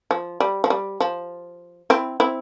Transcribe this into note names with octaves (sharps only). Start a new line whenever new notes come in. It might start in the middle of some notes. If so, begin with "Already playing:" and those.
F3
G3
F3
G3
F3
C4 E4
C4 E4